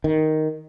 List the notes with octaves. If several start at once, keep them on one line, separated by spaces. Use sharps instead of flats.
D#3